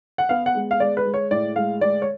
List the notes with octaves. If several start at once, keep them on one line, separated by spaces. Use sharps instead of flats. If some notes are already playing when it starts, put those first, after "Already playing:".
F#5
B3 F5
F#5
G#3
F5
G#3 D5
B4
G#3
C#5
A2 D5
G#3 F5
G#3 D5
C#5